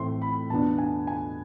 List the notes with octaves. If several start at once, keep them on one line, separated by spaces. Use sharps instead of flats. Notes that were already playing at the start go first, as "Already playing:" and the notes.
Already playing: A2 E3 A3 C4 C6
B5
E2 B2 B3 D4 A5
G#5
G#5